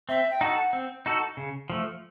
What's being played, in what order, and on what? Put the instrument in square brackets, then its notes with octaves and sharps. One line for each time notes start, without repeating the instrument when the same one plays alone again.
[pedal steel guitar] C4 [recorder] E5
[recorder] G5
[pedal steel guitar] D#4 F#4 A4 [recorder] F#5
[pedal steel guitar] C4
D#4 F#4 A4
C#3
F3 A3